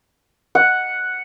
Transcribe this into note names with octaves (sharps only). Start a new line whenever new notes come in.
F#5